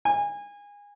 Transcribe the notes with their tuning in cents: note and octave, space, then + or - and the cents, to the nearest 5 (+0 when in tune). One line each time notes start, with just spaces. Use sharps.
G#5 -25